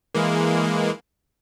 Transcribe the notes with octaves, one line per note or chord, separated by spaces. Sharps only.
E3 G#3 A#3